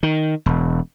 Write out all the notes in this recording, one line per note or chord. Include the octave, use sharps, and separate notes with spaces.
D#3
E1